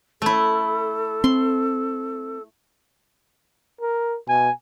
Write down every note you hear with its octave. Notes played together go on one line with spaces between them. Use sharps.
A3 E4 A4
C4 C6
A#4
B2 G#5